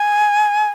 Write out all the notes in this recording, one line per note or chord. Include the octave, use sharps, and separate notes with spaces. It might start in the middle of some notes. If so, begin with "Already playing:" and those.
Already playing: G#5